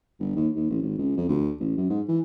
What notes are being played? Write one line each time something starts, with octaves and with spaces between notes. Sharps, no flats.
G1
D#2
D#2
A1
G#1
C#2
F2
D2
A1
F#2
G#2
E3